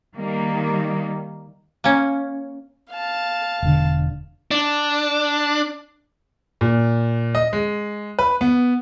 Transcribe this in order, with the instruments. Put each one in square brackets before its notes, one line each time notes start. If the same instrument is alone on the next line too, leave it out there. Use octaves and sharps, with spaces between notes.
[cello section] D#3 G3 A#3 D#4
[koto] A#3 C#4
[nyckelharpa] F5 A5
[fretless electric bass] E1 D3
[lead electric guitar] D4
[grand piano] A#2
D#5
G#3
B4
B3